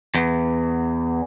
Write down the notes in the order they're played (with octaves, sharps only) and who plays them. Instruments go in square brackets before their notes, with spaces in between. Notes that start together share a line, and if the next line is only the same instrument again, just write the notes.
[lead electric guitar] E2